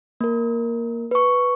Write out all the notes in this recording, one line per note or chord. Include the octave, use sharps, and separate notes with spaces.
A#3 A#4
B4 C#6